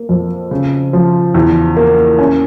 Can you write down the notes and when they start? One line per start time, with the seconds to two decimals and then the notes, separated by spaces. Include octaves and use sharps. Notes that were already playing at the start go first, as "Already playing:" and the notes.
Already playing: A#3
0.09 F2
0.51 C#3
0.93 F3
1.34 E2
1.77 A#3
2.19 C#4